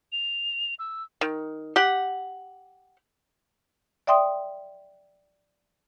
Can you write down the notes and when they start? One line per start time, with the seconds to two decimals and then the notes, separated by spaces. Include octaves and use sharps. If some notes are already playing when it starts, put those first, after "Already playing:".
0.12 F7
0.79 E6
1.21 D#3
1.76 G4 F#5
4.07 D5 E5 G5 C6 D#6